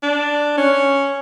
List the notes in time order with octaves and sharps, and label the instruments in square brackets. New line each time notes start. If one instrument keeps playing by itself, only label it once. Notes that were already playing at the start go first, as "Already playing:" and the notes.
[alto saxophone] D4
C#4